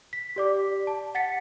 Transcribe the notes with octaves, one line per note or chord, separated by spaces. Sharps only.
B6
G4 D5 D6
A5
F#5 A6 B6 C#7